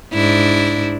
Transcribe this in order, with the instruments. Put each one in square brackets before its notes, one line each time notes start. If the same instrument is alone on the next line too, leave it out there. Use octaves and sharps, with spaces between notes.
[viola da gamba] G#2 D4 E4